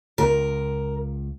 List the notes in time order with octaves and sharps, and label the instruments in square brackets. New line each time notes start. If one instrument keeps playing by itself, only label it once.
[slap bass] C#2 [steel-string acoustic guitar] A#4